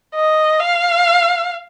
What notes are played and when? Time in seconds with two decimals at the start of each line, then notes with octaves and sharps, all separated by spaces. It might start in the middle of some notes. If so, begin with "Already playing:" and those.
0.15 D#5
0.60 F5